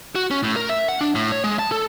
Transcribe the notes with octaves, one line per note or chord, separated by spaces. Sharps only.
F#4
C#4
A2
A#4
E5
F#5
D4
A2
C#5
G#3
A5
A4